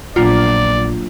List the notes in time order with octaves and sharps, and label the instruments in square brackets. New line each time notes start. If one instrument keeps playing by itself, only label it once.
[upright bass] A#1 B3 [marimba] F#3 A#3 D4 [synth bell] F4 [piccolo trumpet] D5